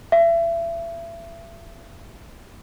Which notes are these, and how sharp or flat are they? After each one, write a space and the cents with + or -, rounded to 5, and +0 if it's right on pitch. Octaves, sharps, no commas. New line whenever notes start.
E5 +30